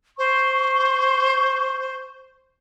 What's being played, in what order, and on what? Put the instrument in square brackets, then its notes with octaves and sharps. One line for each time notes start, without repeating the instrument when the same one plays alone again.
[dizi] C5 [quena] C#6